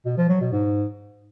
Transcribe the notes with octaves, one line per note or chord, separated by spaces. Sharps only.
B2
F3
F#3
B2
G#2